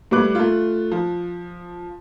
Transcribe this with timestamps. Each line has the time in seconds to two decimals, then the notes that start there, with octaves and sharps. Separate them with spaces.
0.11 A2 G3 B4 D6 F#6
0.35 A3 F4
0.91 F3